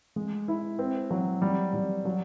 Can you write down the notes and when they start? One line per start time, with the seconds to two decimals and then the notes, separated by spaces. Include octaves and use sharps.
0.16 G#3
0.48 E4
0.79 C4
1.10 F#3
1.42 G3
1.74 G3
2.05 F#3